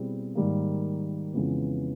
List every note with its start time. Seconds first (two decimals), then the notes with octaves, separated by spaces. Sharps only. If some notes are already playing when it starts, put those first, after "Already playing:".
Already playing: B2 G3 C4 E4 G#4
0.35 G#2 D#3 G3 A#3
1.34 F2 C#3 E3 G#3 B3